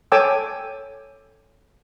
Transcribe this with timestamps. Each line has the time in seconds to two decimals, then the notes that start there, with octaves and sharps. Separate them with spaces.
0.12 A4 C#5 G5 G#5 D6 E6